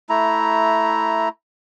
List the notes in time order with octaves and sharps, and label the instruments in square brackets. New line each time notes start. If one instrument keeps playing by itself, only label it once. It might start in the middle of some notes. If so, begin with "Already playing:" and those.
[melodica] A3 E4 A#5